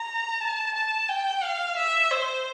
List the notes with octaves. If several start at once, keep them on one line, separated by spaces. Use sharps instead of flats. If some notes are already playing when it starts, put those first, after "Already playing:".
Already playing: A#5
A5
A5
G5
F5
E5
C5